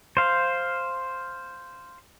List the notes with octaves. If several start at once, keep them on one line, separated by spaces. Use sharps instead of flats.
C5 F5